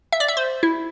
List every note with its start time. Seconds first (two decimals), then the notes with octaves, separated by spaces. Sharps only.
0.12 E5
0.20 D5
0.28 E5
0.37 C5
0.63 E4